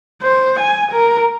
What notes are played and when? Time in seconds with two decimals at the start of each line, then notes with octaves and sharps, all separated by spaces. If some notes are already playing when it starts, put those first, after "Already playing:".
0.22 C5
0.59 G#5
0.91 A#4